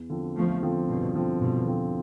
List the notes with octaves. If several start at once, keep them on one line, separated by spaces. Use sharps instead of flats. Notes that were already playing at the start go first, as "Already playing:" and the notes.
Already playing: E2
D3 F3 C4
E2 F3 A3
D3 F3 C4
E2 G2 B2
D3 F3 C4
E2 G2 B2
D3 F3 C4